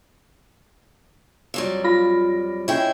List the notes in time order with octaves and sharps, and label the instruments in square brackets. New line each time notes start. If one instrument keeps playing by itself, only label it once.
[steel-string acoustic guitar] F2 F#3 G3
[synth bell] F4 B5 A#6
[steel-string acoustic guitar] G#3 E4 [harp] C#4 G5